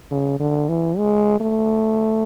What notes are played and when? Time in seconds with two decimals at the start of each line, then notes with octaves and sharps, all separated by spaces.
0.11 C#3
0.40 D3
0.69 E3
0.97 G#3
1.40 A3